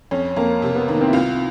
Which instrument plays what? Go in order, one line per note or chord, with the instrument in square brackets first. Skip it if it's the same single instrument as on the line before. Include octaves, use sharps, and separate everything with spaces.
[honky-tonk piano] F2 [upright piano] C#4
[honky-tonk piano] F2 [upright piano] A#3
[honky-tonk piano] C3 [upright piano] A#3
[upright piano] B3
[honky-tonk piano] D#3 [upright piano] A#3
[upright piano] C4
E4
[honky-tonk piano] C2 [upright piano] F4